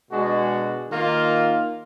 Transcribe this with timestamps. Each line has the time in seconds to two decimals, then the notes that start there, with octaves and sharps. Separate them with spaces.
0.10 B2 G#3 D4 F#4
0.88 D#3 A#3 F4